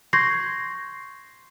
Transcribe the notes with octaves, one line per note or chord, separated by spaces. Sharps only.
C6 C#6 G6 G#6 A#6 C7